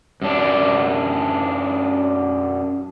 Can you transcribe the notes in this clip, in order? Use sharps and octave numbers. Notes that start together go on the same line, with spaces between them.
F#2 D4